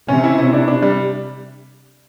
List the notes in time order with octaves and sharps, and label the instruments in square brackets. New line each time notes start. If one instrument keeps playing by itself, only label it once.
[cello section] C3 [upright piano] C#4
[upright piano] E4
E4
D4
D4
G3